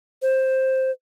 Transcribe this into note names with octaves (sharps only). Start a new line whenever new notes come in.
C5